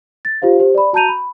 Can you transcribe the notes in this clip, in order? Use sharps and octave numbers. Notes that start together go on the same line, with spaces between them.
A6
F4 G4 C5 F5
G4 C5
D5 B5
F#4 A5 A#5 G6 D#7 F7
B5